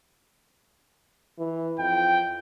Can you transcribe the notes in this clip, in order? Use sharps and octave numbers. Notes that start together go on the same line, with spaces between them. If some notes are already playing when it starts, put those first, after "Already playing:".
E3
F2 G5